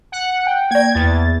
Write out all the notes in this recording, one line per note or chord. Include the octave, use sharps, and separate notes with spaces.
F#5
G5
A#3 D5 G5 G#6
E2 A6